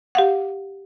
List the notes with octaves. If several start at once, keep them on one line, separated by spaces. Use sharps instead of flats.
G4 F5 F#5